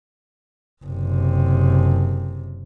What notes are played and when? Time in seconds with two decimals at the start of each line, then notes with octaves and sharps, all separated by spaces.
0.85 F#1 C3